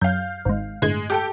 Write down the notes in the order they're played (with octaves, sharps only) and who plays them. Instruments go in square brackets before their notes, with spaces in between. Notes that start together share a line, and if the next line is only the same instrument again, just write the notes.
[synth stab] F#2 [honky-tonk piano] F5 G6
[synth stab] G#1 G#2
[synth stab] G1 A2 G#6 [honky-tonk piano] G#3
[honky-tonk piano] G4 A4 G5